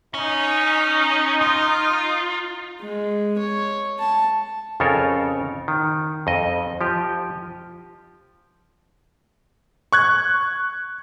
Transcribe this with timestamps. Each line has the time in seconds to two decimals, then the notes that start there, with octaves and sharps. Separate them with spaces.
0.14 C#4 D#4
1.42 F4
2.81 G#3
3.39 C#5
3.99 A5
4.80 F2 C#3 F4 A4 A#4 C#5
5.68 D#3
6.27 F2 D#5
6.81 F3 G4
9.93 C#6 F#6 G#6